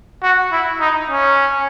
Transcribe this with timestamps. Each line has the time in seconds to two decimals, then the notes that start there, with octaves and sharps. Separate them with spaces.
0.23 F#4
0.52 E4
0.80 D#4
1.10 C#4